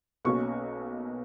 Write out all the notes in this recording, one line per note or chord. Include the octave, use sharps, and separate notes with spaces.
B1 B2 A#3 C#4 C#6